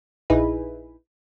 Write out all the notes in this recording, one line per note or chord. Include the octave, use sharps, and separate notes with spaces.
A#1 D#4 E4 G#4 B4